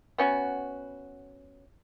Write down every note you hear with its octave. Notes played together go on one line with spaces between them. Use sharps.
B3 C#4 F#4